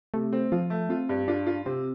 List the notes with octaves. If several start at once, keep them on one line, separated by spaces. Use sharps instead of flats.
C3 A3
C4
F3 F4
A3
C4 F4
G2
D4 F4
F4
C3 C4